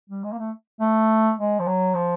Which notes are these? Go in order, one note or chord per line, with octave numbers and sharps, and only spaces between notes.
G3
G#3
A#3
A3
A3
G#3
F3
F#3
F3